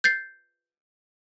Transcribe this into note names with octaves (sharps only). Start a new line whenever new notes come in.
G6 A6 C7